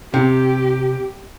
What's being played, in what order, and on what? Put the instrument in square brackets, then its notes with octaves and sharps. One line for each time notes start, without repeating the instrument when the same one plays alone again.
[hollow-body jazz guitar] C3 [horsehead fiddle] G4